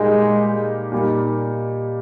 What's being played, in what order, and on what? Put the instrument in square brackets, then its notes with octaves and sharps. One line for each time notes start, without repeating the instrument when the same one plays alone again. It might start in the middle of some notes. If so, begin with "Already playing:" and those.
Already playing: [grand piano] A#2 G3 A#3 D#4 G4 [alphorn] G#3
[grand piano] A#2 G3 A#3 D#4